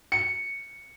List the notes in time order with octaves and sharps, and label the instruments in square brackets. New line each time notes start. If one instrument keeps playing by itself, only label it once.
[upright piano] C#7